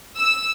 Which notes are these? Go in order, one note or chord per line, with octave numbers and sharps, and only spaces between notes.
E6